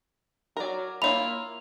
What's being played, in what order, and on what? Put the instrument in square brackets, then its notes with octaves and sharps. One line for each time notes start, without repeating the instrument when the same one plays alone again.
[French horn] F#3 [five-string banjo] A#4 D5
[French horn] A#3 [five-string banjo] E4 F4 A#4 [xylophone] C#5 F5 B5 [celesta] F7